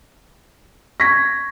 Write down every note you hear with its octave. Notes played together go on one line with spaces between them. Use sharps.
C#6 G#6 A#6 B6